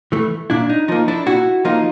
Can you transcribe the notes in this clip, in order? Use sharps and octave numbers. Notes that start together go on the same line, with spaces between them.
E3 A3
A#2 D4 E4
D#4
F3 A#3 D#4
D4 E4
A#2 E4 F#4
F3 A#3 D#4 F4